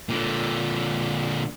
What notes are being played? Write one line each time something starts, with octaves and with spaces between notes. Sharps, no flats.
A#2 D3